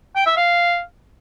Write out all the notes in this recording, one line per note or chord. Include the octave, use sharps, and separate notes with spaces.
G5
E5
F5